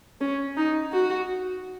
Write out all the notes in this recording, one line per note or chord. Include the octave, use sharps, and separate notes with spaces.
C#4
D#4
F#4